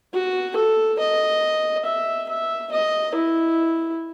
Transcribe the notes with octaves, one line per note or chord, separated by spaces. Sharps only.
F#4
A4
D#5
E5
E5
D#5
E4